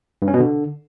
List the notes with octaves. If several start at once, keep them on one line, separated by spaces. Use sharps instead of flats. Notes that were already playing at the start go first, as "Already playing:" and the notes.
G2
C#4
B2
D3